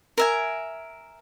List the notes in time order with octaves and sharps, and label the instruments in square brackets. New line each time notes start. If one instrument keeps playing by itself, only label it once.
[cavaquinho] A#4 E5 G#5